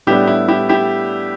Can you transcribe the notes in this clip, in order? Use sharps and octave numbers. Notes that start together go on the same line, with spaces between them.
A2 G3 B3 D4 E4 G4
E4
E4 G4
E4 G4